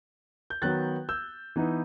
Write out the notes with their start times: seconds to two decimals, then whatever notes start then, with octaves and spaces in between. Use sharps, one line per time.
0.50 G6
0.62 D#3 F#3 B3 F#6 A6
1.09 E6 G6
1.56 E3 B3 D#4